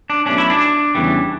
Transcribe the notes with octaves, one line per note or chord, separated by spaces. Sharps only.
D4
B1 B2 A3 C#4 D4
E4
D4
E2 C#3 E3 G3